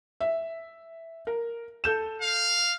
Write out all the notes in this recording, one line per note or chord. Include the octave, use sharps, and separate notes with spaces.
E5
A#4
A4 G6 E7
F5